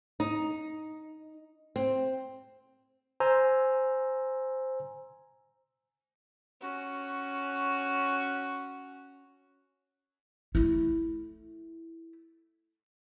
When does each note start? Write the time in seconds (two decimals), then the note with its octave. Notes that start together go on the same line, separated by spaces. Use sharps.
0.20 D#4
1.76 C4
3.20 C5 G#5 A#5 E6
6.61 C#4 F#4
10.55 A3 E4